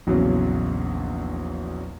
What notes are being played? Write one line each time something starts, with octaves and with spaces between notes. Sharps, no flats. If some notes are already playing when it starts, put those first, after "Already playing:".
A#1 E2 C#3 F#3